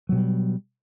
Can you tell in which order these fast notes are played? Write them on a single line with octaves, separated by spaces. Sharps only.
F#3 B2 G3